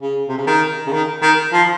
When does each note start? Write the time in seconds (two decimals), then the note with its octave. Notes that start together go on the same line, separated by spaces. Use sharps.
0.02 C#3
0.29 C3
0.37 C#3
0.47 D#3
0.87 C#3
0.93 D#3
1.22 D#3
1.53 F3